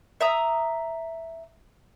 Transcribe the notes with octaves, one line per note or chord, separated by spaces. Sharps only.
E5 A#5 D#6